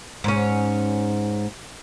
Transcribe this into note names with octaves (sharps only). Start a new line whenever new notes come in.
G#2 C#4